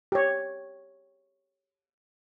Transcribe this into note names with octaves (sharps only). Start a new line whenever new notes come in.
G4 C#5